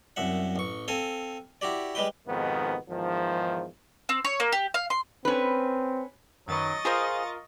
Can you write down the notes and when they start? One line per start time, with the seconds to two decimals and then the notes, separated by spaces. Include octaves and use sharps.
0.16 C2 F#2 E5 F#5
0.56 A1 C#6
0.88 C4 A4 F5 G#5
1.61 E4 F#4 G4 D5
1.95 G3 G#3 B4 G5
2.26 F2 G#2 B2 D#3 B3
2.89 E2 G#2 D#3 F3
4.09 C4
4.25 C#5
4.40 A#3
4.52 G4
4.74 F5
4.90 C6
5.25 C4 C#4 B4
6.48 F#2 D#3 F#3 B4 D#5 C#6 A6
6.85 F4 G#4 A#4 C5 F5 D#6